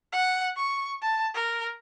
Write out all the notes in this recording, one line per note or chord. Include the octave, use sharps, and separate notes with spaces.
F#5
C#6
A5
A#4